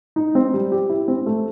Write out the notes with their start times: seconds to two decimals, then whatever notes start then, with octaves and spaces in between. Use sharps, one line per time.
0.16 D#4
0.35 C4
0.54 G3
0.72 G4
0.90 E4
1.08 C4
1.26 A3